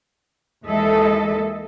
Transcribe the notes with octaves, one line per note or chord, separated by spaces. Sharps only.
D#2 E3 G#3 A4 D#5 E5